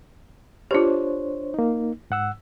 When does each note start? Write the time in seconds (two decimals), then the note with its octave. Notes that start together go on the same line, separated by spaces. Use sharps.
0.71 D4 F4 G4 C5 C#5
1.54 A#3 D#4
2.10 G#2 F#5 E6